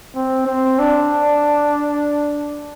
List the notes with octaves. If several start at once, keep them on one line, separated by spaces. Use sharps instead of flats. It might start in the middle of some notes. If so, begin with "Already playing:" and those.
C4
C4
D4